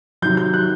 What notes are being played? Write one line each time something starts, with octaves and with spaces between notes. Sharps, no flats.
C3 D#3 F#3 G6
G6
F#6